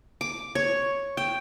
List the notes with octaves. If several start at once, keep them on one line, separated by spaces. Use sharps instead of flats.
D6
C#5
G5